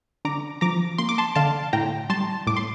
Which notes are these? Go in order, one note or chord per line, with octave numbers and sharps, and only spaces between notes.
D3 A#5 D6
F3 A#5 D6
A#3 C6
D6
A5 C6
D3 F5 A5
A2 G5 A#5
G3 A5 C6
A2 D6
C6